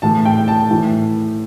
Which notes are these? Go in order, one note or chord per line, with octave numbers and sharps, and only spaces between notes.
A2 E3 A5
G5
A5
A2 E3